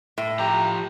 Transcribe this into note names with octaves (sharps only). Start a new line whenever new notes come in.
A2
F3 G4 A#5